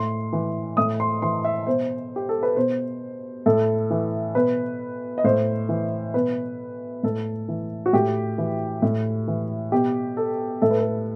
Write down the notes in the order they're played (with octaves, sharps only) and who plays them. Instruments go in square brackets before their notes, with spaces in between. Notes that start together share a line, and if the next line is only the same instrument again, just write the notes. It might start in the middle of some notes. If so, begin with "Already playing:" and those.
Already playing: [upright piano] A2 C6
E3
A2 D#6
C6
E3 C6
E5
B2 C5
G4
A4
B4
B2 C5
A2 A4
E3
B2 B4
D#5
A2 C5
E3
B2 B4
A2 A4
E3
F#4
A2 G4
E3
A2
E3
B2 G4
A4
A2 A4
B4
A4